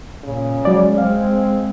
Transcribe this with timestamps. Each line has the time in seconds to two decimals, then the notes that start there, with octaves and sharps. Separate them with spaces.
0.24 A#2 C#3
0.65 F#3 G#3 D5
0.98 C4 F5